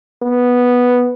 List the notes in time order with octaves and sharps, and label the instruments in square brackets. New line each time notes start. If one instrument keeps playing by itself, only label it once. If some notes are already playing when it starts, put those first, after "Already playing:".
[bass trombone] B3